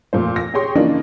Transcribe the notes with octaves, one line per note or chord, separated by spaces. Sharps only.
F2 A#2 A3 C5
A#6
G4 G#4 C#5 G5 C6 C#6
C#3 E3 F3 A#3 D4 D#4